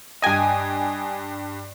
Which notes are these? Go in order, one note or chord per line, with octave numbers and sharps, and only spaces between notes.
G2 D#5 G5 G#5 D#6